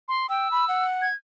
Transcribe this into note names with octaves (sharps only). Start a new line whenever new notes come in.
C6
G5 E6
B5
F#5
G#6